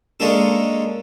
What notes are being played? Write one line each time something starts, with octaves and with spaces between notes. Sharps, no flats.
G#3 A#3 C#4 D4 A4